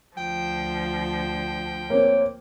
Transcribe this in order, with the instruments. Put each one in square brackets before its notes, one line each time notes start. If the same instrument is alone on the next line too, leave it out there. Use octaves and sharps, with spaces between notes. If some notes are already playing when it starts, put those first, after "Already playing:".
[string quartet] D2 F3 [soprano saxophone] G5
[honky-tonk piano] A#3 C4 [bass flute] C#5